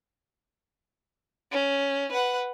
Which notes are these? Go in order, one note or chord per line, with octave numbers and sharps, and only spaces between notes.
C#4
B4 F#5